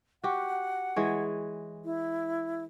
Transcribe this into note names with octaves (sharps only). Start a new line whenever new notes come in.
F#4 G4 F#5
E3 G#3 C#5
E4